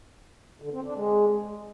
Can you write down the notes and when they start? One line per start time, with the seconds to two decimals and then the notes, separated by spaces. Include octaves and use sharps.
0.62 D3
0.73 C4
0.84 D4
0.96 G#3